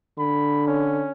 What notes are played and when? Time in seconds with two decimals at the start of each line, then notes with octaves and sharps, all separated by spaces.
0.18 D3 B5
0.67 C#4